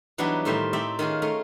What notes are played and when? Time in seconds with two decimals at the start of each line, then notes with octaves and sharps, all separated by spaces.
0.18 E3 F#3 G3 B3 D4 D#4
0.45 A2 D#3 G3 C5 E5 A#5
0.73 A3 C4 D#4 G4 D5 E5
0.99 D#3 C#4 F4 G#4
1.22 A3 D#4 G#4 A#5